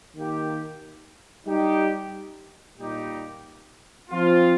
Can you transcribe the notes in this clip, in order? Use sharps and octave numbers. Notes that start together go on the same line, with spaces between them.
D#3 A#3 G4
G3 D#4 G4
A#2 G3 D#4 G4
F3 C4 F4